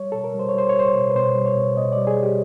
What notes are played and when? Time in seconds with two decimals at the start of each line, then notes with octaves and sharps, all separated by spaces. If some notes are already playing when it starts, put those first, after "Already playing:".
Already playing: G3 C#5
0.12 B2 A4
0.24 A#4
0.34 G3
0.39 C5
0.49 C#5
0.54 G3 C5
0.69 G3 C#5
0.79 C5
0.95 B2
1.10 B4
1.16 B2 C5
1.35 G3
1.46 C#5
1.57 B2
1.77 B2 D#5
1.93 G3 D5
2.07 G#4
2.18 G3 G4